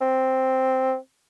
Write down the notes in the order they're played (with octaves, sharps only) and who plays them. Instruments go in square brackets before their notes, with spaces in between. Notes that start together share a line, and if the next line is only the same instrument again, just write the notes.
[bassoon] C4